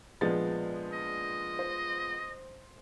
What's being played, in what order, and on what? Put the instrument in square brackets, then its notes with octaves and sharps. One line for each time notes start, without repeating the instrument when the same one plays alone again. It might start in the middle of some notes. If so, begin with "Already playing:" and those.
[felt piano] A#1 G#4 A6 [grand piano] F3 G#3 B3
[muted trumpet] D#5
[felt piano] C5